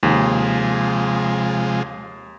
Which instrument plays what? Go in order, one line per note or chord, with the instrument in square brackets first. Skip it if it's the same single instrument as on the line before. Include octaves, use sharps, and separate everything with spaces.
[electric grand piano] D#2 [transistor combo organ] C3 F3 G#3